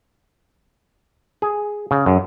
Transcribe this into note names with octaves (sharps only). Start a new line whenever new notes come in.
G#4
C#3
F#2